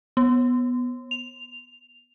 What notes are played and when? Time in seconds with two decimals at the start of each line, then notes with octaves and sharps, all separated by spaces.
0.17 B3
1.11 F7